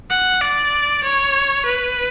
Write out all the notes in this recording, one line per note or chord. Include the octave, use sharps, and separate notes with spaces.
F#5
D5
C#5
B4